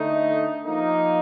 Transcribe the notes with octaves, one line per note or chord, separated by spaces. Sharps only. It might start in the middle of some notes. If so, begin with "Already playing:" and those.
Already playing: D3 A3 D#4
F3 A#3 D#4